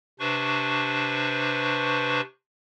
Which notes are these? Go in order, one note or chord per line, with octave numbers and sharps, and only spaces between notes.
C3 D4 B4 C5 C#6